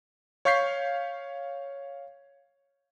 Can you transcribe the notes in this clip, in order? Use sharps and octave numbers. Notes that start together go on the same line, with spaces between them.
C#5 F5 C#6 G6 B6 C7